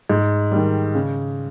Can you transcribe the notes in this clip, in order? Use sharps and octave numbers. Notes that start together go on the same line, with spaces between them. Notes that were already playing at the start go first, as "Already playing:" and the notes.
G#2
D#3 G3
C#3